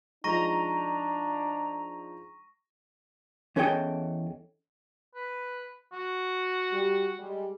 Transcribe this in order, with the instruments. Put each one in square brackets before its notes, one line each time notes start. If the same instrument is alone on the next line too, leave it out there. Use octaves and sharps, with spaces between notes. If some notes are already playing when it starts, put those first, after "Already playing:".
[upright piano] F3 G#3 D#4 [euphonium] D4 [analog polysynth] A#5 [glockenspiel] C#6 A#6 D#7
[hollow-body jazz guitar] E2 C#4 G#4 A4 D#5 G5
[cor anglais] B4
F#4
[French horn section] G3 G4
G3 G#3